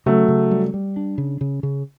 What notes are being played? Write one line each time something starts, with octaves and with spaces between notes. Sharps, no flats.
C#3 F#3 A3
C#3
G3
G3
D4
C#3
C#3
C#3